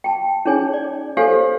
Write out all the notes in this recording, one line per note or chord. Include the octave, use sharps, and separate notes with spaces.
G5 A5
C#4 D#4 G#4 C#5 G#5
D5
G4 A4 C5 C#5 F5 G#5